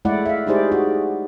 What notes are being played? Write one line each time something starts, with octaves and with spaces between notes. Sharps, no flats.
G#3 A3 E4 D5 F#5
E5 F5
D#4 E4 G4 G#4 C5 D5
F#4